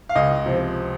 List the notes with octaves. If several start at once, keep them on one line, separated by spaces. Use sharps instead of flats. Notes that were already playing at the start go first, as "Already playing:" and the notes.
F5
C#2 D#5
C3 F3 C4